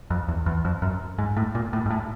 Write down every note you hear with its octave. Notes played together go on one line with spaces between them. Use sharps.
F2
E2
E2
F2
F#2
G#2
A2
A#2
A2
G#2
A2